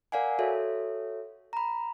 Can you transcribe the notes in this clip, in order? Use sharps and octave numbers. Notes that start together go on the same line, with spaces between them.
A#4 D5 F5 F#5 G#5
F#4 A4 C#5 E5
A#5 B5